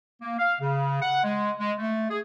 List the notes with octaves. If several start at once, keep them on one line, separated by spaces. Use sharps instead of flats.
A#3
F5
C#3
F#5
G#3
G#3
A3
G#4